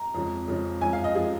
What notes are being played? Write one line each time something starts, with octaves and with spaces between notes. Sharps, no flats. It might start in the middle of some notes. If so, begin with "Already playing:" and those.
Already playing: A#5
F2 C#3 F3 G#3
F2 C#3 F3 G#3
F#2 F3 G#3 G#5
F5
D#5
F3 G#3 G#4